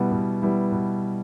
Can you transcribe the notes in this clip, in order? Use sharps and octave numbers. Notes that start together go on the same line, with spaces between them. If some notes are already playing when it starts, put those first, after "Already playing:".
Already playing: B2 G3 B3 E4
B2
G3 B3 E4
B2